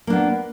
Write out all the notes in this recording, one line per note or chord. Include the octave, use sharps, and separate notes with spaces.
A#3 B3 D4